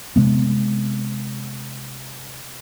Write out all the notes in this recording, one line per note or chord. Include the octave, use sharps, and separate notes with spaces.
C3 G#3 B3